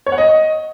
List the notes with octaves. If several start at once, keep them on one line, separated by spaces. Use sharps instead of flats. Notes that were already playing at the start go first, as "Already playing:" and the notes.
C#5
F#5
D#5